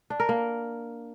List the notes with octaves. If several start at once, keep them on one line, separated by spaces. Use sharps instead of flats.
D4
A#4
A#3